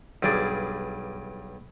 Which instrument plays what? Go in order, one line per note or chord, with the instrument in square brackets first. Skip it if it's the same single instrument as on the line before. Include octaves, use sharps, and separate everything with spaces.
[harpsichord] B1 G2 D4 G#4 D5